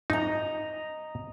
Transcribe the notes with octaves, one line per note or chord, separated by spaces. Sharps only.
D#4 D#5 A#5